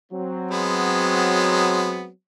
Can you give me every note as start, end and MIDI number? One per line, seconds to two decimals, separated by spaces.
0.12 2.10 54
0.12 2.10 60
0.51 2.06 56
0.51 2.06 59